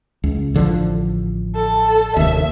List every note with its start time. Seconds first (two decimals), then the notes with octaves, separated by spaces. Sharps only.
0.24 C#2
0.54 A1 D3 F3
1.55 A4
2.17 F1 D#2 E5